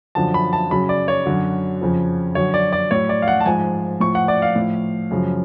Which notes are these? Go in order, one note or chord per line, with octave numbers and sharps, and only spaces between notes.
F#2 D3 F3 A5
B5
A5
F#2 C#3 F#3 B5
D5
C#5
F#2 D3 F#3
F2 C#3 F3
F#2 D3 F#3 C#5
D5
D5
A2 F#3 C#5
D5
F5
F#5
A5
G#2 F3 G#5
A2 F3 C#6
F#5
D5
F5
A2 F3
F#2 C#3 F3